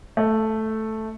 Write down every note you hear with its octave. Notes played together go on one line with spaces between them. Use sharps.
A3